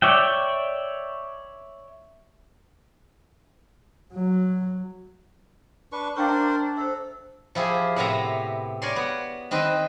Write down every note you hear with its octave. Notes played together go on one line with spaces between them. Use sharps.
C#5 D5 E5 G5
F#3
D4 B4 C#6
D4 A#4 C5 F5 G5 C#6
D4 E5 A#5
A4 C5 E5
F3 E4 G4 G#4
A2 C3 B3 C4 E5 A#5
A#4 C#5 D5 G#5 C6
B3
D#3 C4 B4 C5 D#5